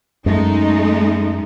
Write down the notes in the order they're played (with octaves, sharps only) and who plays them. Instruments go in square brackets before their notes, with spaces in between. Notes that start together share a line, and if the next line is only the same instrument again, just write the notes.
[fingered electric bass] F#2 [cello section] G#3 A3 D#4